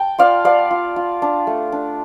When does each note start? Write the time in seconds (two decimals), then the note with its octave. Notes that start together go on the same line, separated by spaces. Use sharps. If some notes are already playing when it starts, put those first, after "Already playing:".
Already playing: G5 A5
0.18 F4 D5 F5
0.44 B3 D5 F5
0.71 F4
0.96 F4
1.22 D4
1.47 A3
1.72 D4